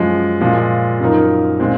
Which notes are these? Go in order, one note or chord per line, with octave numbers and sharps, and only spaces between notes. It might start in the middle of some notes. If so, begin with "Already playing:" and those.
Already playing: F#2 F3 G#3
A#2 F3 G#3
F#2 F3 A#3 D#4 A#4
A#2 G#3 C4